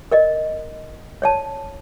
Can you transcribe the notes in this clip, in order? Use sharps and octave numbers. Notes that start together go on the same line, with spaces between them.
A#4 D5 D#5
C#5 D5 A5